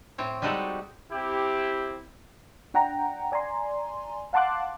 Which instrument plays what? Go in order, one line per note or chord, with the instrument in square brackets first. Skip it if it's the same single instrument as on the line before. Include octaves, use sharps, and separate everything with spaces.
[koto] A2 C4 C#5
G3 G#3 D#4 F#4 G4 A4
[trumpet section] C4 E4 G4
[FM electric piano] D4 F#5 G5 A#5
D5 G#5 A#5 C6
F5 F#5 A5 C6 D6 F#6